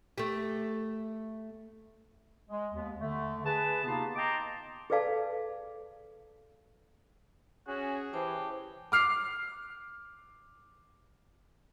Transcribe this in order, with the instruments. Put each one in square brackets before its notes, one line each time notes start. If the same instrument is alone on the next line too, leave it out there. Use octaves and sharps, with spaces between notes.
[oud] A3 G4
[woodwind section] G#3
D#2 B3
D3 A3
G#4 B4 A5
C3 A#3 B3 D#4 F4 A5
D#5 G5 A5 A#5 C6 D6
[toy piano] G#4 A4 B4 D5 F5 A5
[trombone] C#4 [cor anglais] F#4 [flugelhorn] G#4
[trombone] E3 [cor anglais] G4 [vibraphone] C5 A5
[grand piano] D6 F6 C7